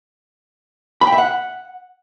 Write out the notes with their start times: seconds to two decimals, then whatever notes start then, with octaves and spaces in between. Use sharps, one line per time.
1.01 B5
1.07 G5
1.12 E5
1.18 F#5